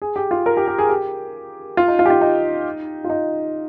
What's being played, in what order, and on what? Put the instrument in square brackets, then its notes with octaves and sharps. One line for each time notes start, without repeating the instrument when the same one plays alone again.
[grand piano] G#4
G4
F4
A#4
G4
G4
G#4
G4
F4
D#4
F4
G4
F4
D#4
F4
D#4